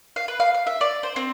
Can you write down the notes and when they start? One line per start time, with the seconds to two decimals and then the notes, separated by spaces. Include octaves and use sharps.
0.16 F5
0.28 B4
0.40 F5
0.54 F5
0.67 E5
0.81 D5
1.03 C5
1.16 C4